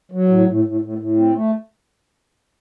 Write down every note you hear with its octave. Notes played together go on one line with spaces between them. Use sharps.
F#3
A2
A2
A2
A2
A2
C4
A3